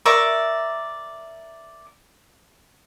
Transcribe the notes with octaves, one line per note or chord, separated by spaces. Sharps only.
A#4 D5 E5 C#6